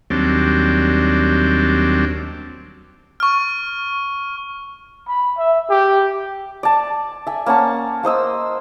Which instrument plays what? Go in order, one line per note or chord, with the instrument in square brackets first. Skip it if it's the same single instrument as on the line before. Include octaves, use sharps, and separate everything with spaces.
[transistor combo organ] D#2 F#3 G3 C4 D4
[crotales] C#6 F6
[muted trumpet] B5
E5
G4
[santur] D5 A5
E5 G#5
A#3 C#4 F#5 A5
A#3 C5 D#5 E6